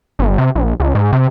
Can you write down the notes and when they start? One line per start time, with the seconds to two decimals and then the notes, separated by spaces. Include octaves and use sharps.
0.19 G1
0.38 C3
0.55 A#1
0.80 C#2
0.95 G#2
1.13 C3